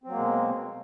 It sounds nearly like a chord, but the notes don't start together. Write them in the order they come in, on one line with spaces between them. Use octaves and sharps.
C4 F#3 A#3 G#3 B2